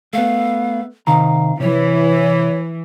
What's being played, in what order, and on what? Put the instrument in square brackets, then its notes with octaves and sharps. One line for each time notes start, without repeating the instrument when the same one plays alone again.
[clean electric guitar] A3 B3 [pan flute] F5
[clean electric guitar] C3 D#3 A#5 [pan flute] F5
[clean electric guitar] C3 [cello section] E3 [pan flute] C#5